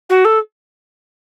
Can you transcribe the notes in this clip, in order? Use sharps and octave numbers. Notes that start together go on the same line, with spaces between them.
F#4
A4